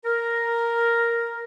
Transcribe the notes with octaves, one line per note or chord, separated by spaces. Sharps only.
A#4